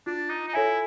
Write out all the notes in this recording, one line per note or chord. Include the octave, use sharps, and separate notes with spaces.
D4 F4
D#4
D#4
E4 A4 C#5 E5 G#5